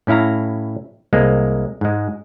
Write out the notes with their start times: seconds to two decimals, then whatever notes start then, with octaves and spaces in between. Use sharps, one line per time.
0.07 A2 C#4 E4 F5 A#5
1.13 C2 G#3 A#3
1.81 G#2 G#3